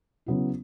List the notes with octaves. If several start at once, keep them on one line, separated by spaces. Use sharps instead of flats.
C#3 F#3 B3 E4